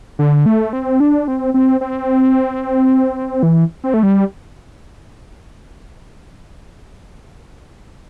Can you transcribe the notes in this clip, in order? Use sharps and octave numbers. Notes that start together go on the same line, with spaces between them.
D3
A3
C4
D4
C4
C4
C4
E3
C4
A3
G3